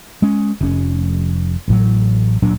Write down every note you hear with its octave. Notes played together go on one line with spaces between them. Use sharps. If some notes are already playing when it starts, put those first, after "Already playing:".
G#3 C#4
F1 C#4
A1 A2 F#3
D1 A#2 F#3 D4